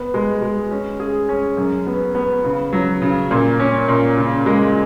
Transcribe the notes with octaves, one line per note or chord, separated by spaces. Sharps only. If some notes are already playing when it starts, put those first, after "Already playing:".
Already playing: B3
G#3
G#3
C#4
G#4
C#4
F#2
B3
B3
C#3
F#3
C#3
A#2
C#4
A#2
C#3
G#3